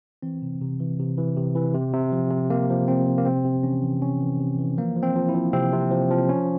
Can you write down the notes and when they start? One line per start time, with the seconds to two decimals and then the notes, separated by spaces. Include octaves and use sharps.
0.22 E3 C4
0.42 C3
0.61 C3
0.80 E3
0.99 C3
1.18 E3
1.37 C3
1.55 E3
1.74 C3
1.93 C3
2.12 F3
2.31 C3
2.50 C3 A#3
2.70 F3
2.88 F3 C4
3.07 F3
3.18 A#3
3.26 C3 C4
3.45 C3
3.63 E3 C#4
3.83 E3
4.02 C3 C#4
4.21 E3
4.40 C3
4.59 E3
4.78 F3 A#3
4.96 F3
5.03 C4
5.16 F3
5.29 E4
5.34 F3
5.53 C3 C4
5.73 C3
5.91 F3
6.10 F3
6.29 F3 C#4